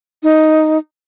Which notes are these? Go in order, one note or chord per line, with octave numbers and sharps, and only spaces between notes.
D#4